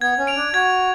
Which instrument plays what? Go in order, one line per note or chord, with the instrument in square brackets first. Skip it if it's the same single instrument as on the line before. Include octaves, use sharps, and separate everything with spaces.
[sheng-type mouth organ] B3 [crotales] G#6
[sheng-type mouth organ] C#4
[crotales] D7 F7
[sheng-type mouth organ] D4
[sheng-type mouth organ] F#4 [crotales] G#6